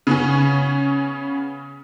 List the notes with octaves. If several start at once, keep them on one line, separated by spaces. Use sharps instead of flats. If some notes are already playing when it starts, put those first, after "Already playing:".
C#3 B3 C#4